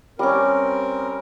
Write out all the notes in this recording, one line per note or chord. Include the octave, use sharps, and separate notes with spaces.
G3 C4 C#4 A#4